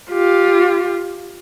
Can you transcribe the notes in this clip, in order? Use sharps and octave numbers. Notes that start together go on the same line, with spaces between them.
F4 G4